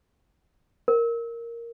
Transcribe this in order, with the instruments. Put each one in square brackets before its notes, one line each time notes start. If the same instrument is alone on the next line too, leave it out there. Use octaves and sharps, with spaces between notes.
[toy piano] A#4